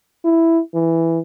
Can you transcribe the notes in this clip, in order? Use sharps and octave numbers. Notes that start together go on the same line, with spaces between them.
E4
E3